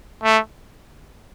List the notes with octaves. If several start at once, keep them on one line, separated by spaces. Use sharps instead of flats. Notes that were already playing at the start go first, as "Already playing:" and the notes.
A3